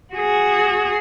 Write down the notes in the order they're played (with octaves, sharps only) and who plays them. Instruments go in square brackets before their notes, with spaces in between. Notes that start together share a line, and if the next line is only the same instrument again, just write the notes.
[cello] F#4 G#4